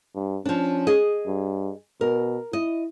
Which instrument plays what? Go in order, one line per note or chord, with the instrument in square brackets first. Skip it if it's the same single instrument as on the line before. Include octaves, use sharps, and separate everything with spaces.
[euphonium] G2
[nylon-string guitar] F3 D4 [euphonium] C#4
[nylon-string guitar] G#4 D#5
[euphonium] G2
[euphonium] B2 [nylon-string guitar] A#4
[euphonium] E4 [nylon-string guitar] D#5